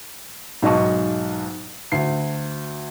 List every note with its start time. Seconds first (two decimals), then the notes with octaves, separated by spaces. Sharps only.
0.62 B1 G#2 D#5 A5 C#6
1.92 D2 C7